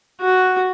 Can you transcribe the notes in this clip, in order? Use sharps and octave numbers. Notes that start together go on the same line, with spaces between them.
F#4